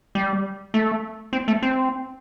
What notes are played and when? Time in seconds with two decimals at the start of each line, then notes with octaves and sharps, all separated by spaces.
0.15 G3
0.74 A3
1.33 C4
1.48 A3
1.62 C4